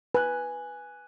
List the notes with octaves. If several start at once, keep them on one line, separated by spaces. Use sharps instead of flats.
B4 G#5 F#6